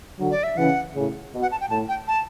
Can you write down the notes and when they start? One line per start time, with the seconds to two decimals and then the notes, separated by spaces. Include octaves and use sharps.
0.19 D3 F#3
0.31 D5
0.43 E5
0.57 C#3 E3 F#5
0.95 A2 C#3
1.32 B2
1.42 F#5
1.51 A5
1.61 G5
1.70 A2 A5
1.89 G5
2.08 A5